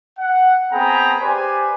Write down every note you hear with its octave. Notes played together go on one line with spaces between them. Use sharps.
F#5
B3 C4 G#4 G5 A#5 B5
G4 B4 C5 D5 G#5